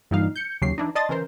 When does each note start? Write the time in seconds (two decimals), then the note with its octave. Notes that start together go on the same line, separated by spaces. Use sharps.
0.11 G2 A#2 E3 G3 D#4 F5
0.36 G6 C#7
0.62 D#2 C#3 F#3 G4 C7
0.78 E3 D4 D#4
0.95 D5 D#5 A5 C6 D#6 A6
1.09 C#3 E3 A#4 C5